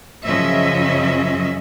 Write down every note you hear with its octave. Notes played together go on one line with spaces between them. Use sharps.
F#2 C#3 F3 C#4 D#5 E5